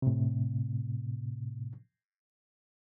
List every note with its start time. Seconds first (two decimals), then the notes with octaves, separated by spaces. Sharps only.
0.02 A2 C3